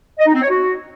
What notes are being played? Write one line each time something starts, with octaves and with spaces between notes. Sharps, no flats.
D#5
D#4
C4
C#5
F#4